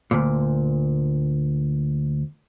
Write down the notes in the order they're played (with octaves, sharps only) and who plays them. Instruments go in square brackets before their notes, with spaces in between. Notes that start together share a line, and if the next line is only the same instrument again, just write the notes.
[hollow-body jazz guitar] D2 A#2